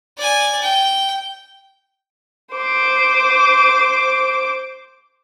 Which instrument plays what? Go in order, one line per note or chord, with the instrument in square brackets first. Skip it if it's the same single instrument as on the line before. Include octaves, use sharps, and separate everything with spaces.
[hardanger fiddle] D5 G#5
G5
[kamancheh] C5 D6